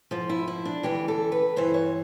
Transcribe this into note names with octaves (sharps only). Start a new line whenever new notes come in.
G#2 F3 F4
E4
E4
D4
D2 C#3 E3 G4
A4
B4
G2 E3 C5
C#5